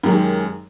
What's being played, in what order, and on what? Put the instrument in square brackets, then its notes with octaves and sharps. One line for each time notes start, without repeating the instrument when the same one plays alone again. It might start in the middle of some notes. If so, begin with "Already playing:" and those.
[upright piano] F#2 D#3 G#3 G4